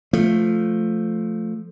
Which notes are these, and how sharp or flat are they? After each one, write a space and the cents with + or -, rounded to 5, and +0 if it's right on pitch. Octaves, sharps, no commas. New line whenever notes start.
F3 +0 A3 +0